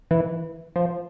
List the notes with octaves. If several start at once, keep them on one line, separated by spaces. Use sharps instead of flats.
E3
F3